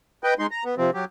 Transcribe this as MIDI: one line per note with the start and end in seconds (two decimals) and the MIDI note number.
0.24 0.34 71
0.24 0.34 75
0.24 0.34 79
0.39 0.47 56
0.39 0.47 63
0.39 0.47 84
0.51 0.64 82
0.65 0.75 59
0.78 0.90 48
0.78 0.90 53
0.78 0.90 60
0.94 1.05 54
0.94 1.05 67